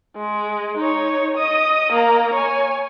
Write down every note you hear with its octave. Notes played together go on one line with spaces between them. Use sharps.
G#3
D#4 C#5
D#5 D#6
A#3 A#5
C#5 G#5